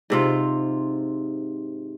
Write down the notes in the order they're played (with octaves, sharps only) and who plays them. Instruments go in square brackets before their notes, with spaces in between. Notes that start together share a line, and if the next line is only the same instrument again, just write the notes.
[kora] G#2 C3 F4